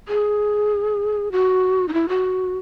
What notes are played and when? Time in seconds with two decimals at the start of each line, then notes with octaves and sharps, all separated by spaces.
0.08 G#4
1.32 F#4
1.88 D#4
1.93 E4
2.09 F#4